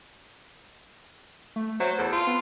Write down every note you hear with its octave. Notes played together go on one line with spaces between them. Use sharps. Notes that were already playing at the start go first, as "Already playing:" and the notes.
A3
F#3 C5
E2 A4
F4
B3